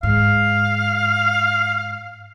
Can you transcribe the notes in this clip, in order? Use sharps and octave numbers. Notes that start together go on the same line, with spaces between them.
G#2 F5